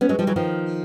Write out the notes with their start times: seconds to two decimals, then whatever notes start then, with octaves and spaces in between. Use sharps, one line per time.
0.01 B3 C#4
0.09 F#3 G#3
0.19 F3 G3
0.27 E3 F#3
0.36 D#3 F3